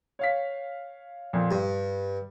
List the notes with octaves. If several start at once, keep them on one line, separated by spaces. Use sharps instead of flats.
C#5 F5 B6
F2 A#2
G2 G3